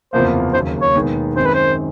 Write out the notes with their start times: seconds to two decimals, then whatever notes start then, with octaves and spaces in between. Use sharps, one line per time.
0.13 F#1 E2 C3 F3 A#3 C5
0.54 D#2 C#3 F#3 C5
0.81 C#5
0.95 E1 D#2 D#3 G#3 B3
1.36 F#2 D#3 G#3 C4 C5
1.45 B4
1.54 C5